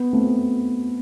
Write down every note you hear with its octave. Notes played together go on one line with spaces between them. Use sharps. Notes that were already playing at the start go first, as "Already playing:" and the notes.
Already playing: B3
A3 C4